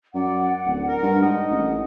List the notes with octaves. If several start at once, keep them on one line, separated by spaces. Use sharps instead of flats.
F#2 D5 F#5
D1
A#4
G2
G#2 D#4 D#5
A1